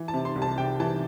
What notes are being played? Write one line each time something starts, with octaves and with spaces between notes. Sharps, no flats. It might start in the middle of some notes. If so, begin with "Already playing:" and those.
Already playing: E3
A5
C3
C6
C2
A5
C3 G5
E3 A5